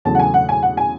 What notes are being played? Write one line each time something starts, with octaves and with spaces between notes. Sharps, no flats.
E2 C#3 F#3 A3 A5
F#5
G#5
F#5
G#5
F#5
G#5